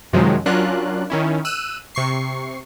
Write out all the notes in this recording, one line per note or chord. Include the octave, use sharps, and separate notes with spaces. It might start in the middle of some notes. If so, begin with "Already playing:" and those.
F#2 C3 D#3 F3 F#3 G#3
F#3 C#4 D4 F4 A#4 F#6
D#3 C#4 E4
E6 F#6 D#7
C3 C#6 C7